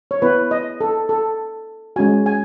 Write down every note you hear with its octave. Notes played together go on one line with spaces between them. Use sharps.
C#5
B3 E4 B4
D#5
A4
A4
G#3 C#4 F#4 G#5
G#5